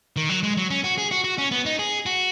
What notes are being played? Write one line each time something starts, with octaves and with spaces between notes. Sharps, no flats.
D#3
F#3
G#3
F#3
C#4
F#4
G#4
F#4
F#4
C#4
B3
D#4
G#4
F#4